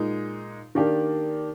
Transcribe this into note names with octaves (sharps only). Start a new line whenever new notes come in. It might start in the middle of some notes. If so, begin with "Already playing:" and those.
Already playing: A#2 G#3 D#4
D#3 A#3 D4 G4